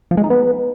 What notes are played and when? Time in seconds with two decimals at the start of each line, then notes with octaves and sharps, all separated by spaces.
0.11 F3
0.17 G#3
0.24 D#4
0.30 B3